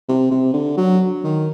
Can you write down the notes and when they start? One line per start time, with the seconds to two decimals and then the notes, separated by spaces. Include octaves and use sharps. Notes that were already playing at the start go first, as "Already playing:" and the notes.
0.08 C3
0.31 C3
0.54 D3
0.77 F#3
1.24 D#3